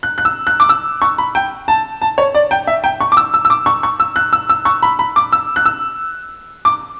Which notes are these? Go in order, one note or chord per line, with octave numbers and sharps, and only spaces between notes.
F#6
F#6
E6
F#6
D6
E6
C#6
B5
G5
A5
A5
C#5
D5
G5
E5
G5
C#6
D6
E6
E6
E6
D6
C#6
C#6
E6
F#6
E6
E6
C#6
B5
B5
D6
E6
F#6
E6
D6